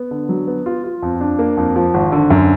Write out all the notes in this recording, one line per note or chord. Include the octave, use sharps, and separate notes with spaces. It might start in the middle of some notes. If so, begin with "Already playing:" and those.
Already playing: B3
D3
F#3
B3
F4
F4
F2
D4
A#3
F2
F3
G#1
D3
F#2